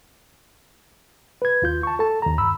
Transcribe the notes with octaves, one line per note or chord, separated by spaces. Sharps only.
B4 G#6
D#2 F4 G6
A5 C#6
A4 A5
D#2 A#5
G2 B5 E6